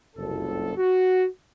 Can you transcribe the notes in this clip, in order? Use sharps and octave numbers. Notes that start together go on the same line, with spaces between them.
F#1 C2 F2 A4
F#4